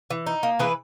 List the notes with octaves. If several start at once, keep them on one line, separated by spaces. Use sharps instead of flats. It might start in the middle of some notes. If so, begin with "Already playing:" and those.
E3
D#4
A#3
E3 G#4 B4